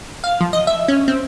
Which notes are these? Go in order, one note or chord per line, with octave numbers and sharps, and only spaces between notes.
F5
F3
D#5
E5
C#4
C4